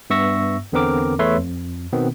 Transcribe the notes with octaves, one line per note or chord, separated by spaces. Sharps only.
G2 B3 E5 C#6 E6 A#6
E2 D3 B3 C4 A#4 D6
E2 A3 B4 C#5 E5 C6
F2
B2 D#3 B3 C4